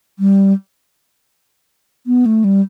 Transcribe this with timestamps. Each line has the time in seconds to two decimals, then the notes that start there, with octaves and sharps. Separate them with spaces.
0.19 G3
2.07 B3
2.26 A3
2.44 G3